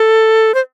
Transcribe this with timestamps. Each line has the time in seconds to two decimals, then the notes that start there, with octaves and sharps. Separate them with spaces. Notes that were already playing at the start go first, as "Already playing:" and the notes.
Already playing: A4
0.54 C5